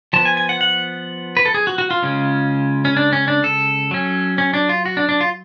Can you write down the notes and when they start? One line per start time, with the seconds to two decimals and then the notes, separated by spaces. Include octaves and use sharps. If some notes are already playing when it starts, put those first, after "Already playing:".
0.13 F3 B3 A5
0.25 G#5
0.37 G#5
0.49 F#5
0.61 F#5
1.37 B4
1.45 A4
1.54 G#4
1.67 F#4
1.78 F#4
1.91 F4
2.03 C#3 G#3 C#4
2.85 C#4
2.97 D4
3.13 C#4
3.28 D4
3.44 A4
3.91 F#3 C#4
4.38 C#4
4.54 D4
4.69 F4
4.86 F#4
4.97 D4
5.09 D4
5.21 F4